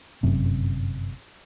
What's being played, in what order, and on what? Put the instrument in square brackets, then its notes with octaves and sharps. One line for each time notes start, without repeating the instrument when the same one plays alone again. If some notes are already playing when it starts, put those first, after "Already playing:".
[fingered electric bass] G1 F#2 C3